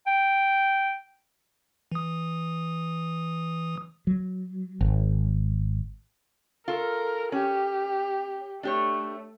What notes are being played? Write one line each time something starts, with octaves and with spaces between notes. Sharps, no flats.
G5
E3 D#6
F#3
G#1
F4 A4 A#4
C#4 G4
A3 D4 G4 C#5